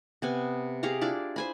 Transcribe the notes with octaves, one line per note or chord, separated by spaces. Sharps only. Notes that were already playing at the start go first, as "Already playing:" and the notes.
C3 B3 G#5
G4 G#4 F5 A#5
D4 E4 F4 D5
C5 G#5 B5